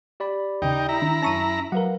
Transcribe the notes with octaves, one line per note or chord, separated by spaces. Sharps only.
G4 D5 B5
D#2 C#3 D#4 G5
E4 A#5
D#3 D4
F#2 C#4 A5 C#6 D#7
F#3 A#4 B4 F5 F#5